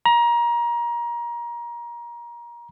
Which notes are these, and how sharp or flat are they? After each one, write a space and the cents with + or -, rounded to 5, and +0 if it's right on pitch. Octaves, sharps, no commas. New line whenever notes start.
A#5 +25